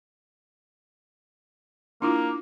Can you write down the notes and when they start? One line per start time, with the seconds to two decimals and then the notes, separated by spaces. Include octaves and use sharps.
2.02 A#3 D4 E4 F4